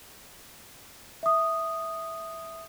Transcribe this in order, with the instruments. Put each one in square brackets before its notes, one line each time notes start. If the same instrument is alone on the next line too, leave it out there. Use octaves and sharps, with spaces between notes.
[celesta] E5 D#6